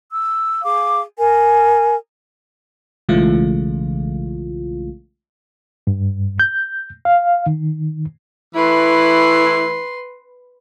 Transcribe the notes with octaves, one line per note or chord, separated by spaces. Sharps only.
E6
G#4 F5 D6
A#4 G#5
B1 C#3 E3 G#3 A3 F4
G2
G6
F5
D#3
E3 A3 E4 B4 C6